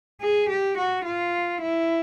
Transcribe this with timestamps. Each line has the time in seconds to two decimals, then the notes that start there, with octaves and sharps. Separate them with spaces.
0.21 G#4
0.49 G4
0.77 F#4
1.05 F4
1.62 E4